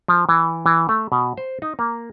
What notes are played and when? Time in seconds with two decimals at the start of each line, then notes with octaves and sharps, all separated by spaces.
0.08 F3
0.29 E3
0.66 E3
0.89 A3
1.12 B2
1.37 C5
1.62 D#4
1.79 A#3